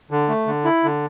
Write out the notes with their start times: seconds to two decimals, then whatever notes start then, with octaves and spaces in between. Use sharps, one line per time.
0.11 D3
0.29 A3
0.46 D3
0.65 E4
0.84 D3